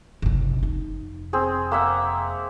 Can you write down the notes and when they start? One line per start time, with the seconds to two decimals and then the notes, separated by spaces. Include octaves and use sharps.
0.22 F#1 C3
0.59 F1 D#4
1.33 C4 G#4
1.72 A#3 E5 F#5